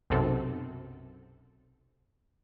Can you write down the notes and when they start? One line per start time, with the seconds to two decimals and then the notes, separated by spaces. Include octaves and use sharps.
0.10 B1 F#2 C3 A4